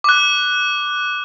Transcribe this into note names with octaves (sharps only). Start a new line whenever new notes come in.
D6 F#6